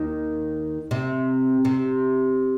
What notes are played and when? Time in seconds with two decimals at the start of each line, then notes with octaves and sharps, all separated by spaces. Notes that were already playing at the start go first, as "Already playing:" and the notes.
Already playing: D#2 D#3
0.91 C3
1.65 C3